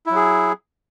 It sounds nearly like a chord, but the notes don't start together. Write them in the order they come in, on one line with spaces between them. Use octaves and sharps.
E4 F#3 G#4